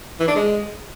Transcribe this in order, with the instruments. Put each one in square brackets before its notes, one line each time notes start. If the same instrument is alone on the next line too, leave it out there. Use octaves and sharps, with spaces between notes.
[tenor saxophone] E3
D4
G#3